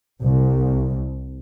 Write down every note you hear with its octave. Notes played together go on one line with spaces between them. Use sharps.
C2